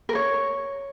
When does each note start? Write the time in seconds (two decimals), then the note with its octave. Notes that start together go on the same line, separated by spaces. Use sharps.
0.09 A#4
0.15 C#5